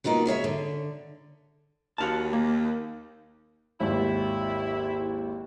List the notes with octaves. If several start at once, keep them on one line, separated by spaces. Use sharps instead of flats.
A#3 B3 D#4 F4 F#4
C#3 G#4 C#5 E5
D3
D#2 F#4 F5 A5
A#3
G#1 D#2 E4